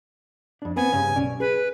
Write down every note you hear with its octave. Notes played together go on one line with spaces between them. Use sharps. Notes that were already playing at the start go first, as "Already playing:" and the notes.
F2 D4
B3 C4 G#5
G2 C#3 C#4
B1 C#4 D5
G#4 B4